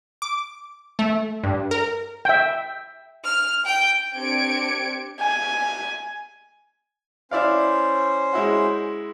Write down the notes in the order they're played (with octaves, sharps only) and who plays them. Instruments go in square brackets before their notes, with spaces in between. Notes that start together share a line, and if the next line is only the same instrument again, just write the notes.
[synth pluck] D6
A3
G2
A#4
[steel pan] E5 G5
[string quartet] F6
G5
[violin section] C4 D4 G4 G#6 C#7 D7
[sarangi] G#5
[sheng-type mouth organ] C#4 C5 [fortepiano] E4 D5 F5
[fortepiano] G#3 E4 F#4